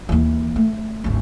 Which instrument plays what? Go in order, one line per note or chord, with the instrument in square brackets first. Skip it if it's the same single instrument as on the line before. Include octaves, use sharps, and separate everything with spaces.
[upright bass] D#2 E3
A3
G#1 D2